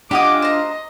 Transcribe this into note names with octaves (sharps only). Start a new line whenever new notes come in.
D4 F4 G4 D#5 F#5 G#5 D6 D#6
C5 D#5 A#5